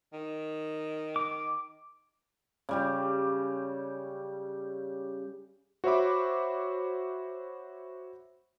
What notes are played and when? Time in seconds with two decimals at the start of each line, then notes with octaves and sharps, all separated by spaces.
0.13 D#3
1.16 D6
2.69 C#3 G3 G4
5.84 F#4 C5 C#5 E5 B5 D6